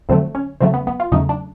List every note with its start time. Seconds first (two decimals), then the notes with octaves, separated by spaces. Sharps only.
0.09 F2 D3 F#3 A3 C4
0.35 C#4
0.60 E2 C#3 F#3 A3 C4
0.74 B3
0.87 B3
1.00 F4
1.12 E2 C#3 F#3 A3 D#4
1.29 D4